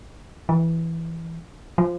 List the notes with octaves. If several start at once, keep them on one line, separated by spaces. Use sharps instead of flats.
E3
F3